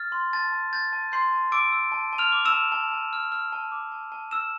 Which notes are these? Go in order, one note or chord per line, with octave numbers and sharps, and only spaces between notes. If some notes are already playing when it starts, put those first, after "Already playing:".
Already playing: F6 A6
C6
A5 A6
A5
G6 A6
A5
C6 G6 C7
A5
D6 E6 D7
E6
A5
A5
F6 F7
D6
E6 E7
A5
A5
A5
F6
F6
A5
D6
A5
A5
E6 F6 E7